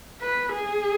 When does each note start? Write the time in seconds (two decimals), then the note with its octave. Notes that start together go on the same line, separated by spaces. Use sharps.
0.22 B4
0.52 G#4